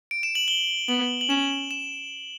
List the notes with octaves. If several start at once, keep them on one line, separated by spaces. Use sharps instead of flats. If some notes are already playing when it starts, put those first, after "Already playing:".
D7
E7
F#7
G7
B3 F#7
F#7
C#4 E7
E7